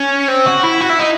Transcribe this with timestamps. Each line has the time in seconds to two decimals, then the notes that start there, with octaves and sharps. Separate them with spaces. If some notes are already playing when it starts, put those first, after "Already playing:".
Already playing: C#4
0.28 C4
0.46 F#4
0.63 E4
0.81 F#4
0.90 E4
0.99 D#4